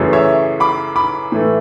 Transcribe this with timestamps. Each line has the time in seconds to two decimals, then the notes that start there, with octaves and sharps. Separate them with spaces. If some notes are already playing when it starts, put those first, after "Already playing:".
Already playing: F#2 C#3 E3 A3
0.13 C#5 E5
0.60 B5 D6
0.96 B5 D6
1.32 A2 E3 A3